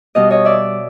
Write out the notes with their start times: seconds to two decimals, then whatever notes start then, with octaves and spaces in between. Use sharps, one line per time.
0.15 B2 G3 D#5 F5
0.30 C#5 D#5
0.45 D5 E5